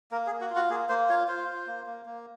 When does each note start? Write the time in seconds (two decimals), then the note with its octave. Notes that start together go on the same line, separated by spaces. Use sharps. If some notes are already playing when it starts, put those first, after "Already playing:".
0.11 A#3 A#4
0.27 G#4
0.32 A#3
0.41 F#4
0.50 F4
0.56 F#4
0.70 A#3 G#4
0.89 A#3 C5
1.09 F4 C#5
1.28 F4 C5
1.48 F4
1.67 A#3
1.86 A#3
2.05 A#3